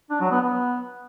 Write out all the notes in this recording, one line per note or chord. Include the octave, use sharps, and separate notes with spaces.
D4
F#3
B3
B3